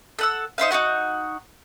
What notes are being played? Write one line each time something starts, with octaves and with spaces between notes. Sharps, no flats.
A4 F#5 E6
D#4 C5 E5 F5
D#4 E4 F#4 F#5